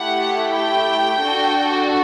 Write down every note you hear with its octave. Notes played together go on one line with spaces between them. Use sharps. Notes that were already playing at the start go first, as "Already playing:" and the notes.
Already playing: A3 E4 G4 F#5
G5
D4 F#4 A4